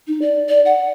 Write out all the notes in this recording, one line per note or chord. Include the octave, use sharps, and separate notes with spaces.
D#4
D5
D5
F#5